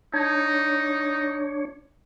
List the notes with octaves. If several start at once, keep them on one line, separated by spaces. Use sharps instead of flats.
D4 D#4 C#5